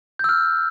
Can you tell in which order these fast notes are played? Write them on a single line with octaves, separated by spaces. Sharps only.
G6 E6 F6